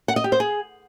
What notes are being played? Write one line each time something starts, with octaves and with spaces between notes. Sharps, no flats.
F#5
D#5
G4
C5
G#4